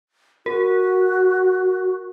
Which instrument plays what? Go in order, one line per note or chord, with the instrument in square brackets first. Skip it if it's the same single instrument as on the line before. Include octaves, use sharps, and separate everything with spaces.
[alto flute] F#4 [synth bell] A#4